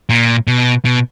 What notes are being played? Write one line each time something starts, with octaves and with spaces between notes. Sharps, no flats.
A#2
B2
B2